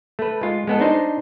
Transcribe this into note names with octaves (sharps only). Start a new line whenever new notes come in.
A3 B4
G#3 F4
G#3 B3 A4
D4 D#4 C5